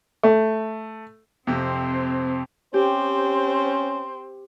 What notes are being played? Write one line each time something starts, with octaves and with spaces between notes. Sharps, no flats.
A3
F2 C3 C4
C4 C#4 G4 C5